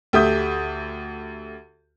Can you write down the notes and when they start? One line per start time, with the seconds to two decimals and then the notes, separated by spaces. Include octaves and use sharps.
0.13 D2 A3 G4 E5 D#6 G6